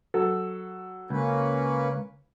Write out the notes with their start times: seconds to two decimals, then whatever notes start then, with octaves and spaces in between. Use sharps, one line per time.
0.14 F#3 A4
1.10 C#2 A#3 C#4 B4